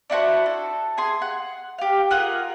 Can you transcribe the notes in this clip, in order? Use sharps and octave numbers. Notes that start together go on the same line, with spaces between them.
D4 E4 F#4 C5
A4
G#4 G#5 C6
F#5
G4 F5
F4 G#4 A#4 F#5